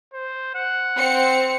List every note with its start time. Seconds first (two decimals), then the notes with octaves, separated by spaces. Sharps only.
0.14 C5
0.55 F#5
0.97 C4 C#7